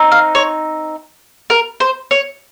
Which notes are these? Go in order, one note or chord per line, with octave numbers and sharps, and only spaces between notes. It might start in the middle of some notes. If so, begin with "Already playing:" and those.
Already playing: C4 D#4
F5
C#5
A#4
C5
C#5